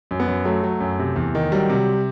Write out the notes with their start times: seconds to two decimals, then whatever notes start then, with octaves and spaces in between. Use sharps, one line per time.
0.11 F#2
0.20 B3
0.27 F#2
0.45 F#3 A3
0.63 F#3
0.80 F#2
0.99 C3
1.16 E2
1.35 D#3
1.52 F#3 G3
1.70 C3